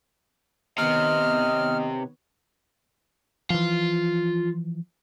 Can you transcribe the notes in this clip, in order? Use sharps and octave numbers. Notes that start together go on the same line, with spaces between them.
C3 D#3 B3 C#5 D#5 F6
E3 F3 F4